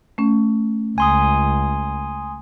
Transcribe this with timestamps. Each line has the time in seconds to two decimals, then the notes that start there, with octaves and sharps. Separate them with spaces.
0.18 A3 C#4
0.98 C#2 G#5 C6 D#6